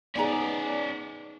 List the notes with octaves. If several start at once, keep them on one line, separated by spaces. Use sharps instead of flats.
B3 C#4 D#4 G#4 C#5 D5 G#5 A#5